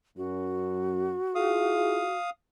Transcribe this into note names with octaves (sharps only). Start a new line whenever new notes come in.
F#2 F#4
E4 F4 G#4 F5 D#6